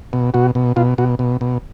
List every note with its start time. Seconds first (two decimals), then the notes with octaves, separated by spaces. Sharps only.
0.13 B2
0.34 B2 F#4
0.55 B2
0.76 B2 F4
0.98 B2 F#4
1.19 B2
1.41 B2